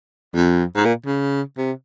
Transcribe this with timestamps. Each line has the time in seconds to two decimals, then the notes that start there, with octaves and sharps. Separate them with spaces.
0.35 F2
0.76 G#2
0.85 A#2
1.06 C#3
1.57 C3